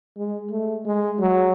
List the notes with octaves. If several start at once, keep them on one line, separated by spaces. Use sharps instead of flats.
G#3
A3
G#3
F#3